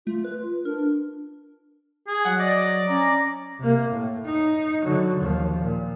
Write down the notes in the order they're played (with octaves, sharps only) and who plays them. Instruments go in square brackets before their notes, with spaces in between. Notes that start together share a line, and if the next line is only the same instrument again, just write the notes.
[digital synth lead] A3 [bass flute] F4
[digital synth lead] B4
[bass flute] D4 [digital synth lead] A#4
[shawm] G#4
[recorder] F#3 [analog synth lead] F#5
[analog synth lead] D5 [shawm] D#5
[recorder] C#4 [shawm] A#5
[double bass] C3 A#3
A2
D#4
D3 F#3
D#2 F3
A#2